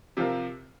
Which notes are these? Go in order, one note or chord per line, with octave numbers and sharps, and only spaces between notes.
C3 F3 C4 F4 A#4